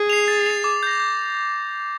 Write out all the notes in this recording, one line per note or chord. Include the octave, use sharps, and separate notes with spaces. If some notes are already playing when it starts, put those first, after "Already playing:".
Already playing: G#4
C7 F7
A6
C7 F7
D6
G6 A#6
G6